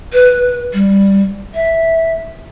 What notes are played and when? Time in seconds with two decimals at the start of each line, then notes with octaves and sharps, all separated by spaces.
0.13 B4
0.74 G3
1.54 E5